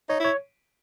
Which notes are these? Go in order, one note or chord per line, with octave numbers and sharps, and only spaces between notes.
D#4 C#5
E4 C#5